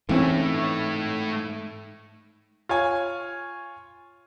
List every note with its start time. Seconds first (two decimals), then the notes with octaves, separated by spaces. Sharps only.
0.09 G#2 E3 A3 C4 C#4 E4
2.69 F4 C#5 G#5